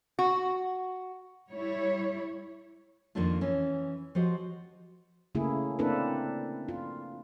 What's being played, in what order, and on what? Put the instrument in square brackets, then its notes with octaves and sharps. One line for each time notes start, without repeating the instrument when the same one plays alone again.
[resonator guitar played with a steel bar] F#4
[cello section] G3 E4 C#5
[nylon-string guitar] F2 D#3 A#3 C4 D4 F4
E3 C#4
F3 F#4 G4 C5 D#5
[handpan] C#3 A3 A#3 E4 G#4
A#3 C4 D4 E4 A4 B4
F4